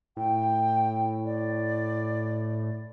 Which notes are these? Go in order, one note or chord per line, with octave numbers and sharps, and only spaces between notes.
A2 G5
D5